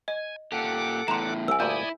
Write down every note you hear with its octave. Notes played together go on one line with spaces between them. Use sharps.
D#5 G#5
A#2 G4 A4 F#5 D6
E2 A2 A#5 C6
C2 G#5 E6
D2 G2 A#2 E4 D5 G#5 D#6 G6